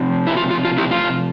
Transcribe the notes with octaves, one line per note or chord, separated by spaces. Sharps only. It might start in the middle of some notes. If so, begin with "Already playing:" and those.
Already playing: C3 F3 C4
E4
F4
F4
F4
E4 G4
F4